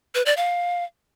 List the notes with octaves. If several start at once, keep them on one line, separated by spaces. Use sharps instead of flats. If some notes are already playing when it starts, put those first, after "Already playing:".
B4
D5
F5